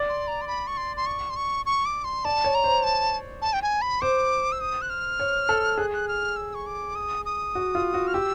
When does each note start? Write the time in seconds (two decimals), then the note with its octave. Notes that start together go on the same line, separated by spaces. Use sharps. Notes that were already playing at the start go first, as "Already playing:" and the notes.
Already playing: D5
0.09 C6
0.28 A#5
0.42 C6
0.48 B5
0.67 C#6
0.77 C6
0.97 C6
1.06 C#6
1.30 C6
1.36 C#6
1.66 C#6
1.86 D6
2.04 C6
2.25 D5 A5
2.45 C#5
2.55 A#5
2.64 C5
2.84 A5
3.42 A5
3.53 G5
3.62 G#5
3.82 B5
4.01 C5 D6
4.52 E6
4.61 D#6
4.82 F#6
4.90 F6
5.20 C#5
5.49 A4
5.78 G#4 F#6
5.94 F#6
6.08 F6
6.36 E6
6.55 C#6
6.66 D6
6.95 D#6
7.25 D#6
7.55 F#4
7.75 F4
7.94 F#4
8.07 F6
8.14 G4 E6